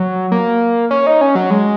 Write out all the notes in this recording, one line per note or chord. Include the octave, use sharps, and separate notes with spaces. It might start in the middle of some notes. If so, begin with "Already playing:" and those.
Already playing: F#3
A#3
C#4
D#4
C#4
F#3
G#3